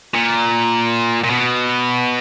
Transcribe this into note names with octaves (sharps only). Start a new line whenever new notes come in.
A#2
A#2
B2